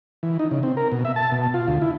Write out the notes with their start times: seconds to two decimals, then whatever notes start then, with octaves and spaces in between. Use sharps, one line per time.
0.23 E3
0.39 D#4
0.51 C#3
0.63 C4
0.77 A#4
0.92 B2
1.05 E5
1.16 A5
1.32 B2
1.54 F4
1.68 D2
1.82 E4